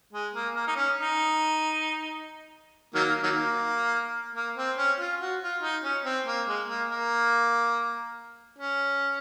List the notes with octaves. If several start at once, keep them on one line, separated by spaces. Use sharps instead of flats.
G#3
A#3
A#3
D#4
C#4
D#4
D#3 F#3 A#3
D#3 F#3 A#3
A#3
C4
C#4
F4
F#4
F4
D#4
C#4
C4
A#3
G#3
A#3
A#3
C#4